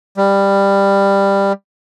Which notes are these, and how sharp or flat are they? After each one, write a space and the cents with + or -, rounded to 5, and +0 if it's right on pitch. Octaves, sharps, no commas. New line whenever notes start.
G3 +15